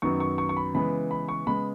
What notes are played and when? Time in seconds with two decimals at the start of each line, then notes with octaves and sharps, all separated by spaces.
0.02 F#2 D#3 F#3 B3 C#6
0.20 C#6
0.38 C#6
0.49 C#6
0.57 B5
0.74 C#3 E3 G#3 B3 B5
1.11 B5
1.29 C#6
1.46 C#3 G#3 B3 B5